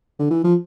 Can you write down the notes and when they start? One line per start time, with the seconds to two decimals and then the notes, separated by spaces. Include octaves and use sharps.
0.19 D3
0.31 E3
0.44 F3